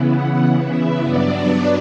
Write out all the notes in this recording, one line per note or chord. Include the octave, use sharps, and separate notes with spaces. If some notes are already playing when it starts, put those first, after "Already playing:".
Already playing: C#3 E3 B3 E4
F#5
E5
G2 F#3 B3 D4 D5